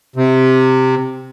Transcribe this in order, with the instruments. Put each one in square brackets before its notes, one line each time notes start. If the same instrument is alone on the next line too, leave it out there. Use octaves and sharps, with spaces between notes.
[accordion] C3